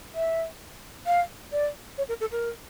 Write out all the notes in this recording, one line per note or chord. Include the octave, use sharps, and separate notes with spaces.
E5
F5
D5
C#5
A#4
A4
A#4